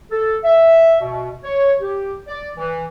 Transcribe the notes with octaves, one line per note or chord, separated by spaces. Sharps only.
A4
E5
B2
C#5
G4
D5
E3